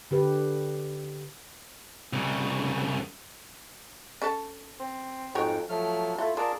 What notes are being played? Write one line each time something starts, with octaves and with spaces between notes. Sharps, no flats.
D3 G4 B4
C2 C#3
C#4 A4 A5
C4
F2 G#2 D#4 F#4 G#4 C#5 G5
F3 F#3 A3 F6
A3 E4 F4 A4
F4 G#4 A#4 D5 A5